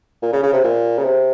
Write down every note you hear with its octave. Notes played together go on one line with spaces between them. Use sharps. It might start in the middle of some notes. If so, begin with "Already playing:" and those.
A#2
C#3
C#3
C3
A#2
C#3
C3